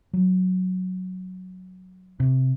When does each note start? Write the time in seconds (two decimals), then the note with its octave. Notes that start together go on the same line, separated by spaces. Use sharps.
0.13 F#3
2.20 C3